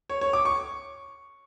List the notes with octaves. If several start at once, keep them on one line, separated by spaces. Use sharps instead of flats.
C#5
C#5
D6
C#6